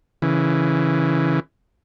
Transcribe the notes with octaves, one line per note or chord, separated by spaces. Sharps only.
C#3 E3